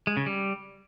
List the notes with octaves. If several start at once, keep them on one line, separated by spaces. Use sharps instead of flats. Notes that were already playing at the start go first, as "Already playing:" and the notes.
G#3
C#3
G3